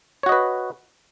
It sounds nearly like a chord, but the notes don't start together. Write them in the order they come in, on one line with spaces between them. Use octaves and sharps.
C#5 F#4 D#5 B4